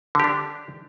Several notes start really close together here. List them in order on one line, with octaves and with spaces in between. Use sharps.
D3 G4 D4